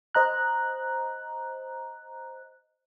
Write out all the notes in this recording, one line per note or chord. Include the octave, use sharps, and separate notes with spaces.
C5 D#5 A#5 F#6